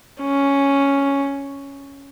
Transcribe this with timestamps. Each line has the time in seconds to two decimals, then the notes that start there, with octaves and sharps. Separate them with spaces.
0.21 C#4